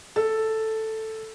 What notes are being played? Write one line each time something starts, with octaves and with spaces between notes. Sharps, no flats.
A4